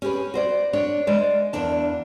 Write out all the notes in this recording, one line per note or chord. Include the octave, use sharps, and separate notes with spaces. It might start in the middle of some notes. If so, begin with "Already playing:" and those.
C#4 G4 G#4 B4
F#4 C5 D5
D4 C#5
G#3 C5 D5
E2 A#3 D4 A5